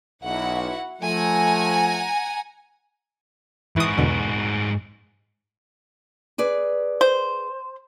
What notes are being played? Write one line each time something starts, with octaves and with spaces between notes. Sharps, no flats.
B1 E4 F#4 F#5
F3 A3 F#5 G#5 A#5
G#2 E3 F#4 D#6
E2 B2 D3
G#4 B4 D5
C5